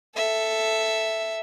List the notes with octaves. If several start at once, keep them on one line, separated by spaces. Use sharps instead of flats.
A4 E5